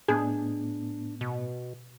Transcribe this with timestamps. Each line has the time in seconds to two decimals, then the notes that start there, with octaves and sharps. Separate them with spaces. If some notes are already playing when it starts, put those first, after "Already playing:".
0.08 A2 B3 D4 G#4
1.21 B2